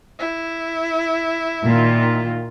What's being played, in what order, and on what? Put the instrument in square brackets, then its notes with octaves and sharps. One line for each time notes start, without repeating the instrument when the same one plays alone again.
[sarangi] E4
[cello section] A#2 D#3 F4